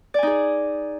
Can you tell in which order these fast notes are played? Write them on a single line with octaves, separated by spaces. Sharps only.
D5 G#5 D#4 G#4